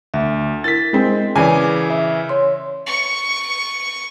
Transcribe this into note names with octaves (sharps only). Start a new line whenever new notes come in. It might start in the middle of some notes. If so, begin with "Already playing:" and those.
D2 E5
E4 A#4 A6 B6
G#3 C4
C#3 E3 D5 G#5 D6
E5
C#5 C6
C#6